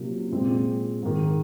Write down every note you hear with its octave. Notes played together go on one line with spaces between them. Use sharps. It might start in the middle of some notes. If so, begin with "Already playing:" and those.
Already playing: C3 F#3 A#3 C#4 F4
A#2 G#3 C4
G#2 D#3 G#3